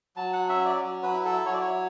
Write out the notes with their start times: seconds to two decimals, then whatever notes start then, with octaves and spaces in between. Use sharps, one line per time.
0.16 F#3 A5
0.33 F#5
0.49 C#4 E5
0.66 D5
0.81 F#3
1.03 B4
1.14 E4
1.25 A4
1.46 F#3 C#5
1.53 D5
1.61 C#5